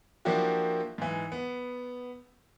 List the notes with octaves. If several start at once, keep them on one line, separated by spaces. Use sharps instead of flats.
F3 A#3 D4 E4 F#4 G4
G#2 E3
B3